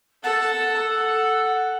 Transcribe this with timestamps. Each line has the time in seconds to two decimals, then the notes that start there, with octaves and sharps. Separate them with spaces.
0.23 A4 F#5 A5
0.78 A4